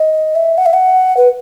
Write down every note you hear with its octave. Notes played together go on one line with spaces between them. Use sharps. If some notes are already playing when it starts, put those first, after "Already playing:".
Already playing: D#5
E5
F#5
E5
F#5
B4